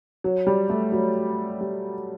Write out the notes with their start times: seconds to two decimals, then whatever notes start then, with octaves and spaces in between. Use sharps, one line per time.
0.24 F#3
0.47 G3
0.70 A3
0.92 F#3
1.61 G3